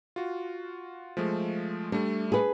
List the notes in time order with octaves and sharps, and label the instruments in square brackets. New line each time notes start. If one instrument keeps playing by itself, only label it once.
[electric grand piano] F4 F#4
F3 G#3 A3
[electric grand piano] G3 A3 [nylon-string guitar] D4
[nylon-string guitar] G#4 B4